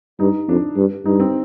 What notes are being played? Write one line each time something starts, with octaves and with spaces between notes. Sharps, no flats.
G2 D#4
F2 D4
G2
G2 D#4
C4